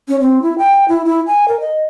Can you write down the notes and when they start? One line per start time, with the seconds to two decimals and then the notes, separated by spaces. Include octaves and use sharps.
0.08 C#4
0.20 C4
0.42 E4
0.58 G5
0.89 E4
1.05 E4
1.27 G#5
1.48 A#4
1.60 D#5